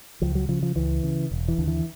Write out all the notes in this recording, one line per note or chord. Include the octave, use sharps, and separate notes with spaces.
C#2 F3
F#3
C#3 F3
F3
C#2 E3
C#3
E1
E3
D#2 D3
E3